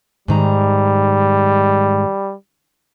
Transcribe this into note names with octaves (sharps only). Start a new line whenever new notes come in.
G#2 D#3 G3 A#5